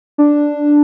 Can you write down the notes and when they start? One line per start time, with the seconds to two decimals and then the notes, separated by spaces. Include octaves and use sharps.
0.18 D4